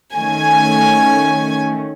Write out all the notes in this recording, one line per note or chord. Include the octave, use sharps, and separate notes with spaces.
D#3 A3 C#4 G#5